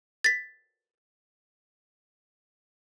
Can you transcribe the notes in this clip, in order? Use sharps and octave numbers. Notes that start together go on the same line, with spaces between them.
A6 B6